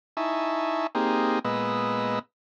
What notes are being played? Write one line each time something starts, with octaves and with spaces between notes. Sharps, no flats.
D#4 E4 E5 G#5 A5 C#6
A#3 C4 D#4 G4 G#4
A#2 G#3 B3 B4 D#5 E6